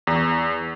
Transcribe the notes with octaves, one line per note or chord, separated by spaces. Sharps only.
E2